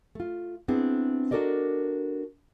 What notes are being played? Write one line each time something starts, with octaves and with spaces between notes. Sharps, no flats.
A3 F4
B3 C4 D4 E4 G#4
D4 F#4 A4 A#4 D5 D#5